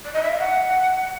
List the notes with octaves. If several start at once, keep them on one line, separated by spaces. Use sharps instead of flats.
D5
D#5
E5
F5
F#5